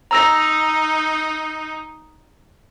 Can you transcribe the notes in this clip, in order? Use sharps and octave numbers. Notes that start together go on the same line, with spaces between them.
D#4 A#5 E6 A#6